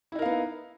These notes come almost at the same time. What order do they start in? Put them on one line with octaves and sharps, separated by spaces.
E4 D#4 A#4 F5 B3